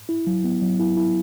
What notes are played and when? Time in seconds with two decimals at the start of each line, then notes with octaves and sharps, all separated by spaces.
0.09 E4
0.27 F#3
0.44 B3
0.62 F#3
0.80 E4
0.97 E4